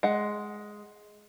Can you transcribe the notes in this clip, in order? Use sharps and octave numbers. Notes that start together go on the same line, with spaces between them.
G#3 F#5